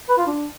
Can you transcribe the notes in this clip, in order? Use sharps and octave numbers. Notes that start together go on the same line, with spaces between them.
B4
F4
D4